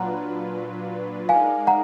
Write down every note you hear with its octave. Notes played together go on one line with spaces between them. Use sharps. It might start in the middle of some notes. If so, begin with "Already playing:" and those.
Already playing: A#2 F#3 D4 F4 B4 F#5 A#5
G#3 D#4 A#4 D5 F5 G#5
F#5 A#5